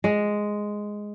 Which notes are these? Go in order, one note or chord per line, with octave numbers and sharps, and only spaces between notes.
G#3